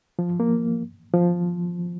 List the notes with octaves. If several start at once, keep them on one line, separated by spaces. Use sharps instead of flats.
F3
A#3
F3